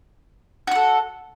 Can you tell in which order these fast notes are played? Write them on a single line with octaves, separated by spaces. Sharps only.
F#4 F#5 A4